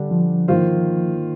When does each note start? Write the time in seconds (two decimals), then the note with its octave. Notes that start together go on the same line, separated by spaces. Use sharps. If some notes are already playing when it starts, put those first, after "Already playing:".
Already playing: D3 G3 D4
0.11 F3
0.48 D#3 A#3 F4 C5